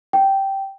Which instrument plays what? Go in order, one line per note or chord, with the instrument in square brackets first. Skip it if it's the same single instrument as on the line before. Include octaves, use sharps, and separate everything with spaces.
[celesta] G5